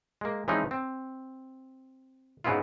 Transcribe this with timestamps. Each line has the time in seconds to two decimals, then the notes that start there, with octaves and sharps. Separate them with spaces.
0.21 G#3 A#3
0.48 E3 F3 G#3 C4 C#4 D#4
0.71 C4
2.44 G#2 C#3 G#3 B3 E4 F4